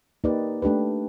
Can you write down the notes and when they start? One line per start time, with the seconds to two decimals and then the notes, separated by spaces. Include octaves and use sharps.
0.24 A#3 D#4 G4 B4 D5
0.62 A3 D4 G4 B4